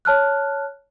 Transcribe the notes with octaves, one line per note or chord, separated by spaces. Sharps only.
C#5 A5 F6 F#6